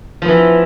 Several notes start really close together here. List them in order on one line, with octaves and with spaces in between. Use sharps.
F3 B3 E3